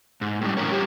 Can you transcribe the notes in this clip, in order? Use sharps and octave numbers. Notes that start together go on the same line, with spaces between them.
G#2
A2 F3 G3
D3 E3 C4 C#4 A#4 C#5
G3 G4 B4 C#5